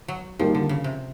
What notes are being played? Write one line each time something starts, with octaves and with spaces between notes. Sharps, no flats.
F#3
D#3 F3 G3 A#3 D#4 G4
D3
C#3
C3